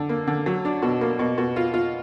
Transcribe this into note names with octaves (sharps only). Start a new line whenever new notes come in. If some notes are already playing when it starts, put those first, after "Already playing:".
Already playing: D3 D4
A#3
D3
F#3
D4
B2
A#3
B2
B2
F4
F4